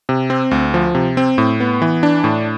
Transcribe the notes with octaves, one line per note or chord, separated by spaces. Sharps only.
C3
C4
D2
F3
C3
C4
A2
B3
E3
D4
A2